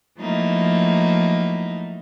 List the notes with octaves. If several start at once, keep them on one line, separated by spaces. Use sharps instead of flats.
F3 F#3 A3 A#3 D#4 E4